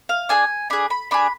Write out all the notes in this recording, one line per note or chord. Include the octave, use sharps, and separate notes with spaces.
F5
D4 G#4 G#5
D4 G#4 B5
B5
D4 G#4 B5